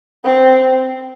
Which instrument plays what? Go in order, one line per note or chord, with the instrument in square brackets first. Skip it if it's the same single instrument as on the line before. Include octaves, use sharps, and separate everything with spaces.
[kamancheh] C4